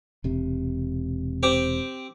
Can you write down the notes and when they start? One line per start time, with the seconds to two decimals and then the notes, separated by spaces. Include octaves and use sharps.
0.24 E1 C3
1.43 C4 G4